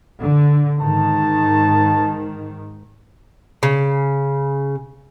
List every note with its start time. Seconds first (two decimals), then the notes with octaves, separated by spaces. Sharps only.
0.21 D3
0.81 G#2 D#3 A5
3.63 C#3